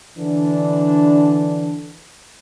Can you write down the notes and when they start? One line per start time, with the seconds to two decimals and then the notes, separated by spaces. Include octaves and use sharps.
0.17 D3 E3 D4